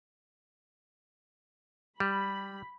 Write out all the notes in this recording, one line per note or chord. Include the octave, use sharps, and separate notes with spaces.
G3 B5